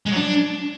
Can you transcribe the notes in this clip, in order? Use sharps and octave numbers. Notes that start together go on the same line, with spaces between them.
G#3
F#3
D4